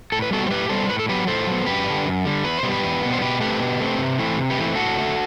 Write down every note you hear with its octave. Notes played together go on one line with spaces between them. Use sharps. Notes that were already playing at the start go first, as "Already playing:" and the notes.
A2 A4
B4
G3 B3 F#4 A4
C5
A2 G4 B4
G3 B3 A4 C5
A2 B4
A4
F#3 B3 G4 B4
A2 A4 C5
F#3 B3
F#2 G4 B4
D3 G3
F#2
D3 G3
E2 B4
C5
B2 G3 B3
G4 B4
E2
B2 G3 B3
C5
B2 G4 B4
A3 C4 G4 B4
B2
A3 C4
C3
E3 A3 C4
C3
G4 B4
E3 A3 C4
A2 F#4 A4
F#3 A3